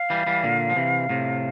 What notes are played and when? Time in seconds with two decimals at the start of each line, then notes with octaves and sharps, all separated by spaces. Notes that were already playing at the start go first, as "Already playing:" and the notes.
Already playing: F5
0.10 E3 G3
0.27 E3 G3
0.44 A#2 D3
0.70 F3
0.76 C3 E3
1.09 A2 C3